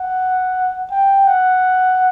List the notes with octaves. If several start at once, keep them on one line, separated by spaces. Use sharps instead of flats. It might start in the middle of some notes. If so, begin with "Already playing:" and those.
Already playing: F#5
G5
F#5